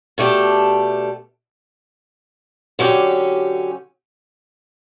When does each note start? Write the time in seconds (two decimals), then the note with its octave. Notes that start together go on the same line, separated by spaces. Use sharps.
0.18 B2 A3 D4 G4
2.79 D3 F#3 C#4 G4